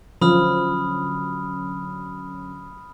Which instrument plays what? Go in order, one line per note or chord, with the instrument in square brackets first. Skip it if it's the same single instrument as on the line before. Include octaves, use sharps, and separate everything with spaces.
[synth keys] D3 F#3 C#4 [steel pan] F3 [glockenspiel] B5 D#6 F6